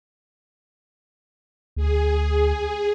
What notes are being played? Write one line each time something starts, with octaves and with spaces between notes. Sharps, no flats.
D2 G#4